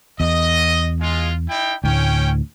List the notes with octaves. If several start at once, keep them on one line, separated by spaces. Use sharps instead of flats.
E2 D#5
G#3 F4
D#4 E4 G5
D2 A2 C#4 G5